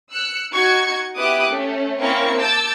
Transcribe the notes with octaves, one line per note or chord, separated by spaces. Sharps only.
E6 F#6 C#7
D#4 F#4 C#6 G#6
B3 E4 G4 D6 D#6 F#6
A3 C#4
A#3 C4 C#4 E4 A#4 C#6
A5 D6 E6 G6 A6